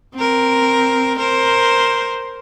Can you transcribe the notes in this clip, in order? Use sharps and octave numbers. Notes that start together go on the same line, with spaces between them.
C4 A#4
A#4 C5